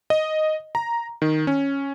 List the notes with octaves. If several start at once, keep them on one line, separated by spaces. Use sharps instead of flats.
D#5
A#5
D#3
C#4